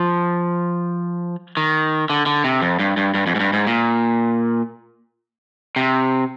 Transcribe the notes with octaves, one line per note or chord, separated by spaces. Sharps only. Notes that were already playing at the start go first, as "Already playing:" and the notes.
Already playing: F3
D#3
D3
D3
C3
F2
G2
G2
G2
F2
G#2
G2
G#2
A#2
C3